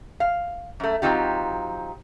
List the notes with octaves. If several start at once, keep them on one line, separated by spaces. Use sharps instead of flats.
F5
F#2 A3
F#3 C4 D#4 F4 G4